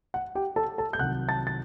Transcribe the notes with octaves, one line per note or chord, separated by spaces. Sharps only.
F#5
G4 G5
A4 A5
A4 A5
G6
C2 C3 D#3 F#3 F#5 F#6
A5 A6
A6